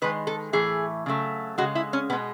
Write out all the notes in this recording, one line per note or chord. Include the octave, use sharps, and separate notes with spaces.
D#3 G#3 B4
A4
A2 E3 A3 G#4
C#3 F#3 A3
C#3 G#3 F#4
E4
C#4
B2 G#3 B3